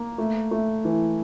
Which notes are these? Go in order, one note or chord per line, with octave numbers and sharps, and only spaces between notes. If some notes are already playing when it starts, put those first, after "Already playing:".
Already playing: A#3
A3
A3
E3